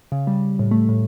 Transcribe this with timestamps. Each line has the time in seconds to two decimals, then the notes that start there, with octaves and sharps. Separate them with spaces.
0.12 C#3
0.27 G3
0.59 A2
0.71 A3
0.89 A2